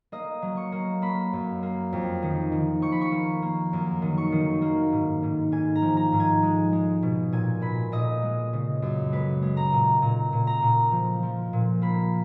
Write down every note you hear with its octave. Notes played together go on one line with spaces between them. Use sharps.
A#3 D#5
F#3
C#6
A#3
A#3 B5
F#2
A#3
F2
D#3
D#3
F3 C#6
B5
C#6
A#3
A#3
F#2
D#3
C#6
D#3
A#3
G#2
G#2
G#2 G#5
A#5
F3
A#5
G#2
G#5
G#3
G#3
B2
A#2 G#5
A#2 B5
A#2 D#5
G#3
C#3
F#2
G#3 B4
G#3
A#5
A#2
A#2 A#5
A#2
A#5
A#2
F3
F3
A#2
A#3 B5